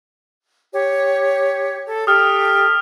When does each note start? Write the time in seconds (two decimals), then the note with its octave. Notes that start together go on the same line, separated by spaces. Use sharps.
0.72 G4 C#5
1.87 A4
2.07 G4 A4 D#6 F6